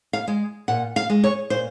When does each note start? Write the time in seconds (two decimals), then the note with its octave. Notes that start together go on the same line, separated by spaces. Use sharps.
0.13 F5
0.28 G#3
0.68 A#2 F#5
0.96 F5
1.10 G#3
1.24 C#5
1.50 A#2 C5